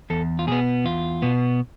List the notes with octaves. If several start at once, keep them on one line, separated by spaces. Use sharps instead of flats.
E2 A4
F4
B2 B3 G#4
E2 F4
B2 B3